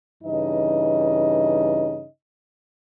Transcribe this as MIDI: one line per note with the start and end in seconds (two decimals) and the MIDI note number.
0.24 2.05 43
0.24 2.05 49
0.24 2.05 52
0.24 2.05 63
0.24 2.05 75